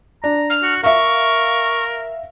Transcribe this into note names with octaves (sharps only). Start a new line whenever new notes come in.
D4 A#5
F6
F#4
A#4 E5 F5 C#6